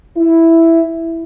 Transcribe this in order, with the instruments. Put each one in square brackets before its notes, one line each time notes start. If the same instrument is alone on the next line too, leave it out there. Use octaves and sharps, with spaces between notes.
[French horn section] E4